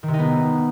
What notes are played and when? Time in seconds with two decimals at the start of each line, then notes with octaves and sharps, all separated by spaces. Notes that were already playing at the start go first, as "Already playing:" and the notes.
0.03 D#3
0.08 C3
0.13 D#4
0.19 B3